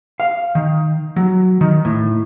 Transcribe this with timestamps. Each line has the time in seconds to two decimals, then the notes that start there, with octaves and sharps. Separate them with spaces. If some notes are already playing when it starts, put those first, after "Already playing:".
0.20 F5
0.55 D#3
1.16 F#3
1.61 D#3
1.85 A2